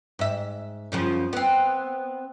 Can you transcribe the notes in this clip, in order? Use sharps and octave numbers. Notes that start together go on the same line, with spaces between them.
G#2 E5
F#2 C#3 F3
B3 C4